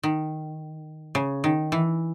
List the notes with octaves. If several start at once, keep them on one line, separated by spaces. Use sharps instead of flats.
D#3
C#3
D#3
E3